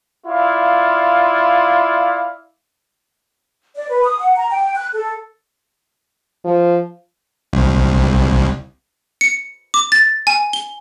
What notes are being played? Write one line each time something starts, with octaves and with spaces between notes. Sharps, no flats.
E4 F4 D5 F5
D5
B4
D#6
F#5
A#5
G5
F#6
A4
F3
C2
C#7
D6
A6
G#5
G7